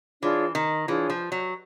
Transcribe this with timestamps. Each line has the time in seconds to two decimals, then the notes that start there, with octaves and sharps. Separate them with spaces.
0.22 E3 D4 F4 G#4 C#5
0.55 D#3
0.87 E3 D4 F4 G#4 C#5
1.10 F3
1.32 F#3